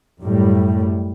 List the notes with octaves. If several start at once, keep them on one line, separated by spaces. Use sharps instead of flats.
F#2 A2 G3